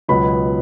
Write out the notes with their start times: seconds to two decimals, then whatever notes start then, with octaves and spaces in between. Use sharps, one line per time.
0.08 C#2 B2 F#3 B3 B5